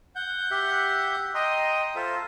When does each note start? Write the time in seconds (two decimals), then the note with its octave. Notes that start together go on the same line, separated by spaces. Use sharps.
0.16 F#5 G6
0.51 G4 E5
1.35 D#5 G5 A#5 C6 D#6
1.95 F4 A4 C5 E5